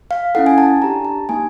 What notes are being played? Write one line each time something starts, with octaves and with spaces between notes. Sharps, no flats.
F5
C#4 E4 A4 F#5
G#5
A5
D4 G4 A#5
A5
A#3 D#4 G4 G#5